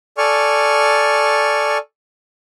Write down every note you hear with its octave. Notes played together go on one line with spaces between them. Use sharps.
A4 D5 G#5 C#6 F6